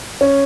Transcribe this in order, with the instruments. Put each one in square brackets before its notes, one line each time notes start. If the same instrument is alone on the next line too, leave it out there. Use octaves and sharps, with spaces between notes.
[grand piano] C#4